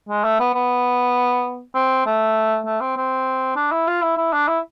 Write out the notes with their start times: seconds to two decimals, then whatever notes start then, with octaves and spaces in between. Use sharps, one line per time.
0.09 G#3
0.24 A3
0.40 B3
0.54 B3
1.75 C4
2.06 A3
2.66 A3
2.81 C4
2.97 C4
3.56 D4
3.71 E4
3.88 F4
4.02 E4
4.17 E4
4.32 D4
4.48 E4